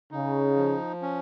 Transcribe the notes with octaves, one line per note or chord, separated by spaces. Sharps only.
C#3 D#4
F3
C#4